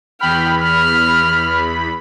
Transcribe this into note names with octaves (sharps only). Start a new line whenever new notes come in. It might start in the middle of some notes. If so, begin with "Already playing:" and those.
E2 G5 B5 F6
F6